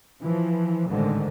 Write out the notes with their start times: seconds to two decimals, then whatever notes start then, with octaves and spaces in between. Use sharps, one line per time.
0.22 E3 F3
0.88 A1 G#2 D3 D#3